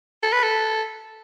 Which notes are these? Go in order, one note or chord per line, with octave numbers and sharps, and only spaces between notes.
A4
B4
A4